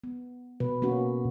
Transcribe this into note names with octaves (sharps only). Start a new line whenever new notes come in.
B3
B2 B4
A#3 C#4 F#4